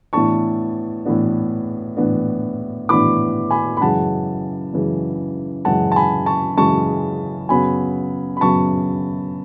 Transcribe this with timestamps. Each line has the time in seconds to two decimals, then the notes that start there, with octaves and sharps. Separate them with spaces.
0.13 A2 E3 B3 D4 A5 C#6
1.05 A2 E3 B3 D4
1.97 A2 E3 B3 D4
2.89 A2 E3 B3 D4 B5 D6
3.51 G#5 B5
3.77 B5
3.81 F#2 C#3 E3 G#3 F#5 A5
4.73 F#2 C#3 E3 G#3
5.65 F#2 C#3 E3 G#3 F#5 A5
5.92 A5
5.96 G#5 B5
6.26 A5 C#6
6.57 F#2 C#3 E3 G#3 A5 C#6
7.49 F#2 C#3 F#3 B3 G#5 B5
8.37 B5
8.41 F#2 C#3 F#3 B3 A5 C#6